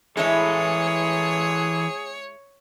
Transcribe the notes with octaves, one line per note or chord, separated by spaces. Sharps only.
E3 G#3 E4 G#4 A4 C#5